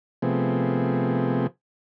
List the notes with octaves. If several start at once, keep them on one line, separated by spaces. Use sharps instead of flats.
C3 F3 A3 B3 C4 G#4